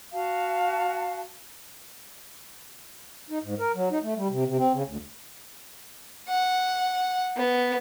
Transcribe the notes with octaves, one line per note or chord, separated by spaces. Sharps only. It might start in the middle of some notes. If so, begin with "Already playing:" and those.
F#4 F5 A5
D#4
G#2
A#4
F#3
D#4
A3
G3
C3
C3
C4
C#3
D2
F#5
B3